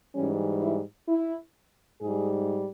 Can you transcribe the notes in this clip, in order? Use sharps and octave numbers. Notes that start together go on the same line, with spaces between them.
G#2 E3 G3 C#4
E4
E4
G#2 G3 G#4